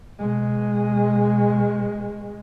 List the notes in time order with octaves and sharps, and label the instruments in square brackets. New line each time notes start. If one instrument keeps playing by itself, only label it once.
[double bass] B2 G#3